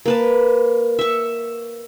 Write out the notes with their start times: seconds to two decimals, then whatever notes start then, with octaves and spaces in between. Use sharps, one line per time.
0.06 A#3 B4 A5
0.99 E5 C#6